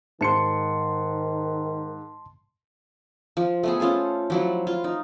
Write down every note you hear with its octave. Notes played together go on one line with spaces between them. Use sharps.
G#2 D#3 A5 C6 C#7
F3
A3 B3 G#4
C#4 F4 A4 C5
F3 F#3 E4
F4
D#4